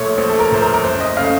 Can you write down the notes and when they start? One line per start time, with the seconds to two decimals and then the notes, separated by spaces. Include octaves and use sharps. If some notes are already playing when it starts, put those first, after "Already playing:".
Already playing: A#1 A#2 A3 C#5
0.18 A#1 C5
0.29 A4
0.40 A#4
0.51 A#2 A3 C5
0.62 A#4
0.74 A#4
0.83 F#1 C5
1.00 D#5
1.17 C#3 A3 F5